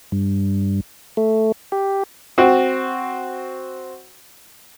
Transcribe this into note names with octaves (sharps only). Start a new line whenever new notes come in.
G2
A3
G4
C4 F#4